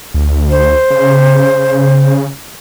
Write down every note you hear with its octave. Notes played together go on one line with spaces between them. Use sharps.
D2
C5
C#3